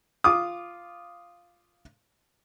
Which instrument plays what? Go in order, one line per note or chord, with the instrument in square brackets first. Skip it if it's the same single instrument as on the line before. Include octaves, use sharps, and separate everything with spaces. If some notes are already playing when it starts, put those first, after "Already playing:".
[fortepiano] F4 D6 D#6